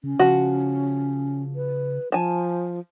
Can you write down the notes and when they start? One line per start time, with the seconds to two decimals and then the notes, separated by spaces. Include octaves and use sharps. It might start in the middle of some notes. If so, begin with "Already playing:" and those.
0.04 C#3 C#4
0.20 C#3 F3 F#4
1.55 B4
2.12 F3 G#5 A5